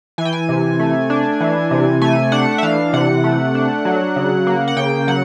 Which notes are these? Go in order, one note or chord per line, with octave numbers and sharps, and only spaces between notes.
E3 G#5
G5
G#5
C3
A3
D4
E3
C3
A3 G#5
D4 F#5
E5
E3 F5
C3 F#5
A3
D4
F#3
C#3
A#3
F#5
C#3 G5
F#3 F#5